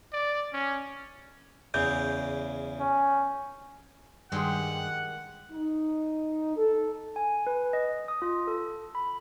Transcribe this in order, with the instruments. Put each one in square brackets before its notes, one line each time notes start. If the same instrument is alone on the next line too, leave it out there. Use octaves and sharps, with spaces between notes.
[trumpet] D5
C#4
[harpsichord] E2 C#3 E3 [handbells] G6
[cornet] C#4
[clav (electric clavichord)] G2 G#4 [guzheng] D#3 G#3 G4 [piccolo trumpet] F#5
[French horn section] D#4
A4
[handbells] G#5
B4
D#5
D#6
F4
A4
B5